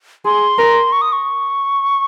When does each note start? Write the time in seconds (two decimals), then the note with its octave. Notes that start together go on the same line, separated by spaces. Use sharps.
0.25 G#4 C6
0.58 A#4
0.92 C#6
1.02 D#6
1.12 C#6